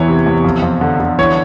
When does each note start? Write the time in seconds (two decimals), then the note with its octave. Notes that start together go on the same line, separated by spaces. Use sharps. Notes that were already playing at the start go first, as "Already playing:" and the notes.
Already playing: E2 E3 C#5
0.08 C3
0.26 E2
0.45 F2
0.63 F2
0.81 D3
1.00 D3
1.18 E3 C#5